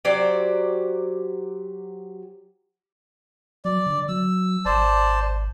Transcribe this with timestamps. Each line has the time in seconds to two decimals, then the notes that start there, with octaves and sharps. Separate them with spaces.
0.05 F#3 G4 C5 D5
3.65 F#3 D5
3.86 D3
4.09 F#3 E6
4.65 G#1 C5 D5 A5